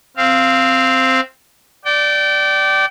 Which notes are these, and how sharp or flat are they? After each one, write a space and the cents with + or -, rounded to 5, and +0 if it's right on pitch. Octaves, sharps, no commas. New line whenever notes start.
C4 +0 F5 -15
D5 +0 G5 -30